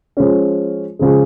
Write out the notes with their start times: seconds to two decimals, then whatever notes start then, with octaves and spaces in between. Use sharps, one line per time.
0.17 F3 G#3 C#4
0.99 C#3 F3 G#3